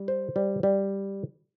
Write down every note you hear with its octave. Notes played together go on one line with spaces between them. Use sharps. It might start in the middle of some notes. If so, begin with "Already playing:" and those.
Already playing: G3
C5
G3
G3